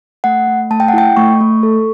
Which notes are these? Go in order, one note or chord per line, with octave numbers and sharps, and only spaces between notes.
A3 F#5
A3
A3 A5
G5
F#5
E4 G5
A3 C#6
A3
A4